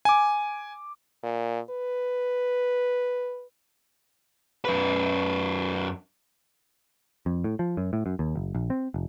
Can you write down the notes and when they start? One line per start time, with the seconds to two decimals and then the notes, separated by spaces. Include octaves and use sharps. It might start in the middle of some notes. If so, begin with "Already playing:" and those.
0.05 G#5 D6
1.23 A#2
1.70 B4
4.65 F#2 B4
7.26 F2
7.44 A2
7.59 F3
7.77 F#2
7.93 A2
8.06 F#2
8.19 D#2
8.36 F#1
8.55 A#1
8.70 C4
8.94 F1